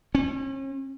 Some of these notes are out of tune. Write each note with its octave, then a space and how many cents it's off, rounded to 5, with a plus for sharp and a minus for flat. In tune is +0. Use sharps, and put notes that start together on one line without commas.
C#4 -40